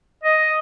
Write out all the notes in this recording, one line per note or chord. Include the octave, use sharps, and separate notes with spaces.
D#5